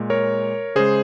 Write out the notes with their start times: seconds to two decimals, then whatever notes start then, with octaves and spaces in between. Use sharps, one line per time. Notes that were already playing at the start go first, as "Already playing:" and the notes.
Already playing: A#2 G#3
0.10 A#4 C#5
0.75 C#3 G#3 G#4 C5